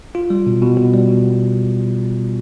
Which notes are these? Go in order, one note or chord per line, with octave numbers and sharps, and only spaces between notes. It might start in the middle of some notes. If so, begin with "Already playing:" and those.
F4
G3
B2
B2
B2
G3
B2